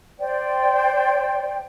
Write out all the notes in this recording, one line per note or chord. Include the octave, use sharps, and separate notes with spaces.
C5 D5 G5